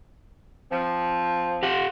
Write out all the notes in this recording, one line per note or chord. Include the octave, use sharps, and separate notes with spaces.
F3 C4
G4 F5 F#5